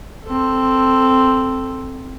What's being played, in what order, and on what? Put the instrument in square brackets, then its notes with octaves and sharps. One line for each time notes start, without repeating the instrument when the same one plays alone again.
[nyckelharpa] C4 A4